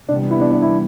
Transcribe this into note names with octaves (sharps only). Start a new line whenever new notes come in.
C3 E3 G3 B3 D4
E4
D4
D4
E4